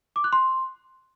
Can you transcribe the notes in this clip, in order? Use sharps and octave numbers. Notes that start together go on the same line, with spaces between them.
D6
F#6
C6